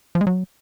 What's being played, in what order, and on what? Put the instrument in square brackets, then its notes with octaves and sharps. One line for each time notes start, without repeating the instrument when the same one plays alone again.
[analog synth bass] F3
G#3
F#3